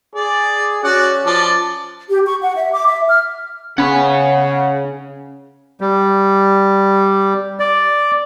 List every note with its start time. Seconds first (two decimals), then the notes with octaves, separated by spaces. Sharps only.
0.15 G#4 D5
0.84 C#4 F#4 D5 F#5
1.26 F3 D5 A5
2.09 G4
2.26 C#6
2.42 F#5
2.56 E5
2.72 D6
2.86 E5
3.09 F6
3.78 C#3 C#4 F#5 B5
5.81 G3
7.60 D5